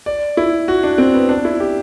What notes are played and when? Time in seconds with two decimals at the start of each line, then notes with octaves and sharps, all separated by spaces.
0.06 D5
0.37 E4
0.68 F#4
0.83 D4
0.98 C4
1.14 B3
1.29 D4
1.45 E4
1.60 G4